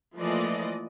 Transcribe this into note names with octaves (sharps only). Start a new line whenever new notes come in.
E3 F3 A3 A#3 D5 D#5